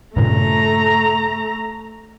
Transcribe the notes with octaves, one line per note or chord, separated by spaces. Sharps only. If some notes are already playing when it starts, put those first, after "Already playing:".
G2 A#2 C#3 A3 A#5